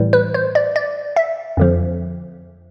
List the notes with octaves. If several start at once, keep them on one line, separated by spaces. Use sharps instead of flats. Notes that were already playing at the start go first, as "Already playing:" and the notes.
Already playing: A2 E3 G3
B4
C5
D5
D5
E5
F2 D3 F3